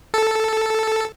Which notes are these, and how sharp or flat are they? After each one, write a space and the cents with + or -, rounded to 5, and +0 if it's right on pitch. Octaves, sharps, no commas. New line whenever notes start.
A4 +0